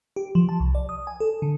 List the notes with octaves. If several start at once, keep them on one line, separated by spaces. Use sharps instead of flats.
G4
F3
A5
C2
D5
D#6
G#5
A4
D3